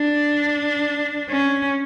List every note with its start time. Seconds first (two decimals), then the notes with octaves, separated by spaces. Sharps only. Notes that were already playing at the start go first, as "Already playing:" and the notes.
Already playing: D4
1.30 C#4